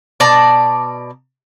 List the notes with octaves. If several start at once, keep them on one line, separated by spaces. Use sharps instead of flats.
B2 D5 A5 A#5